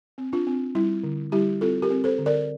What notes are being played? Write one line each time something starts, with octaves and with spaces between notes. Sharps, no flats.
C4
D4 F4
C4
G3 E4
D3
G3 E4 G4
C4 F4 A4
G4 A#4
C4
A4 C5
D3
A#4 D5